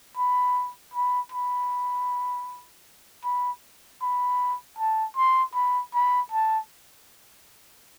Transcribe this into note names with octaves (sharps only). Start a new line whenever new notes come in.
B5
B5
B5
B5
B5
A5
C6
B5
B5
A5